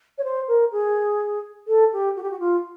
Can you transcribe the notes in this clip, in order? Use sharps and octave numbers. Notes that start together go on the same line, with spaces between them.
C#5
C5
A#4
G#4
A4
G4
F#4
G4
F#4
F4